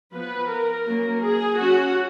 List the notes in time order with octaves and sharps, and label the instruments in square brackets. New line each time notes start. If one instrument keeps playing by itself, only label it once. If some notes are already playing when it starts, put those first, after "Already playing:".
[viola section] F3 B3 B4
A#4
F#3 A#3 C#4
G#4
F#3 C#4 F#4